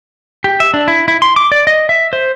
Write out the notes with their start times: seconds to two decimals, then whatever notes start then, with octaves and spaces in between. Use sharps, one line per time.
0.44 G4
0.60 E5
0.74 D4
0.88 E4
1.08 E4
1.22 C6
1.36 D6
1.52 D5
1.67 D#5
1.89 E5
2.13 C5